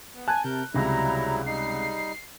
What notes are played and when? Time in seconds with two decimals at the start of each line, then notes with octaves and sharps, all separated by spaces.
0.14 B3
0.28 G#5 A5 F#6
0.44 C3 A#4 G6
0.74 C#2 C3 F#3 G3 E4 A#5
1.46 G3 D#4 C7